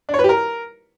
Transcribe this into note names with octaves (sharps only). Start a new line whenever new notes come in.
D4
C#5
B4
G4
A#4